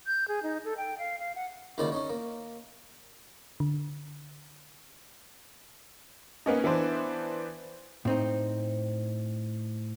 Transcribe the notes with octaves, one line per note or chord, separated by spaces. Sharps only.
G6
G#4
D#4
A4
G5
F5
F5
F#5
C#2 D#3 A#3 C#4 E4 D5
C#4 D#4 C#5
A#3
D3
A#3 B3 C#4 D#4
E3 B3 D4 C5
A2 C4 D#4